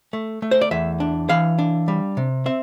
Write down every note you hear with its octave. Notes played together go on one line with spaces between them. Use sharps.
A3
A3
C5
D5
E2 E5
D4
E3 F5
D4
G3
C3
C4 E5